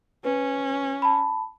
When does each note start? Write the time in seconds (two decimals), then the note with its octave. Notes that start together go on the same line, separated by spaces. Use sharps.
0.25 C#4 B4
1.02 A5 B5